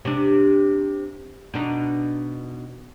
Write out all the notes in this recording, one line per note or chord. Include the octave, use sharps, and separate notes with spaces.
C3 D4
B2 D4 D#4